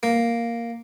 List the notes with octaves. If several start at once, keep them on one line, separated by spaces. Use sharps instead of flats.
A#3